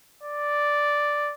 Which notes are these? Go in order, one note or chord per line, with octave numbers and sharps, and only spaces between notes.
D5